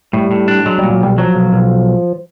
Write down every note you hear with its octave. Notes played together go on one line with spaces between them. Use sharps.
A2 G3
A2
D4
F#3 G#3
A#2 G3
F#3
B1 G3
F3 F#3
B1
B1